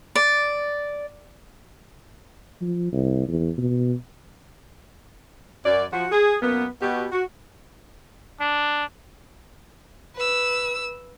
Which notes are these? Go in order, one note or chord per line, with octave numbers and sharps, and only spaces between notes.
D5
F3
C2
E2
B2
F#2 D5
F3 F#4
G#4
F#2 A#3 B3
B2 G4
F#4
D4
B4 E6